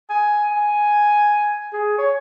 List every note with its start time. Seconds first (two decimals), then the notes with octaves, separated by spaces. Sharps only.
0.10 G#5
0.51 G#5
1.73 G#4
1.98 C#5